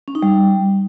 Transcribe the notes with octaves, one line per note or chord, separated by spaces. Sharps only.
C#4
D#4
G3